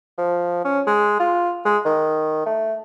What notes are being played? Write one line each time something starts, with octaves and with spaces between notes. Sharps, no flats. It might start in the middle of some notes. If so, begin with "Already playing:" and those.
F3
C#4
G#3
F4
G#3
D#3
A3